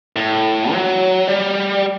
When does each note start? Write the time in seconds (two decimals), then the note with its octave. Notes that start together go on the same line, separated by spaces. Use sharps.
0.16 A2
0.72 F#3
1.28 G3